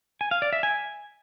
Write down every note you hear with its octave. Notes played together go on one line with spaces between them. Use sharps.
G#5
F5
D5
E5
G#5